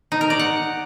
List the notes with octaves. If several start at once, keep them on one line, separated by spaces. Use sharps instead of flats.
D#4
A#4
D5
F#5